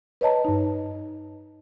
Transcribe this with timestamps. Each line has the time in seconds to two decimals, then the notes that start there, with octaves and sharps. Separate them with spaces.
0.21 B4 C#5 D#5 A5 A#5
0.45 G2 D#4